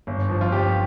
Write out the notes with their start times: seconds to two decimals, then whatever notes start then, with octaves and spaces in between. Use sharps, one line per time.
0.07 G1
0.29 F3
0.41 F4
0.52 G1 G4